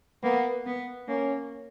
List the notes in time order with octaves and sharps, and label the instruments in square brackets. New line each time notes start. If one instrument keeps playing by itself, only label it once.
[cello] A#3 [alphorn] B3
[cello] B3
[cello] A#3 [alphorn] C#4